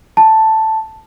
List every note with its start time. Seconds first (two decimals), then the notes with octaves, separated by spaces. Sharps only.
0.17 A5